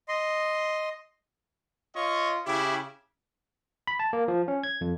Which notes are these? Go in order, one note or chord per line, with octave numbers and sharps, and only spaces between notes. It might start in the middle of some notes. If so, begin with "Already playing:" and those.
D#5 C6
F4 C#5 D#5 C#6
C#3 E4 G4
B5
A5
A#3
F3
C#4
G#6
F2